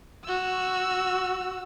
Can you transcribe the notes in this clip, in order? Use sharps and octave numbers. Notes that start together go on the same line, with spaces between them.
F#4 E6